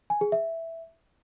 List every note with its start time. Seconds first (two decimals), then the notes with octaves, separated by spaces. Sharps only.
0.10 G#5
0.21 G#4
0.32 E5